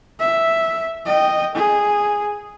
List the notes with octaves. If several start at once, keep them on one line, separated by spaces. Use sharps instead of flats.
E5
D#5 G5
G#4